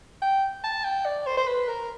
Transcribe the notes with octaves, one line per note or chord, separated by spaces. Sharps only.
G5
A5
G5
D5
C5
C5
B4
A#4